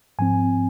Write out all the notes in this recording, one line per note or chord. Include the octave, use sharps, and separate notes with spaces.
G#2 F3 C4 G#5